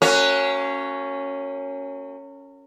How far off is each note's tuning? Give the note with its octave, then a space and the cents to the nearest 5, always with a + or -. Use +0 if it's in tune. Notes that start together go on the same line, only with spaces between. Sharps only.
A#3 -40 C#4 +0 F#4 +0